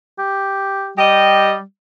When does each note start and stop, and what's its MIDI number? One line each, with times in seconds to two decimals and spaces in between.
0.19 0.93 67
0.97 1.62 55
0.97 1.52 67
0.97 1.52 75